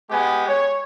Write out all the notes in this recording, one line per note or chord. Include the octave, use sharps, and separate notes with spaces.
G#3 B3 G4 G#5
C#5